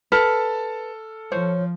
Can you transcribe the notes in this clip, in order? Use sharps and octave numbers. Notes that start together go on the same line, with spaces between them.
A4 B4 A5 F6
F3 C5 C#5